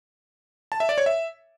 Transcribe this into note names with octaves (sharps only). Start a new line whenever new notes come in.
A5
E5
D5
C#5
E5